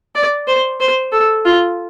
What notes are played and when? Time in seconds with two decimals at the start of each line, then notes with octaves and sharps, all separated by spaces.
0.15 D5
0.48 C5
0.80 C5
1.12 A4
1.45 F4